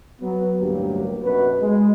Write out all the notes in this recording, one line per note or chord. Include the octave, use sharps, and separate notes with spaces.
F#3 B3
A1 D2 G2 F#3 A#3 G4
F#2 B2 B3 F#4 B4
G#3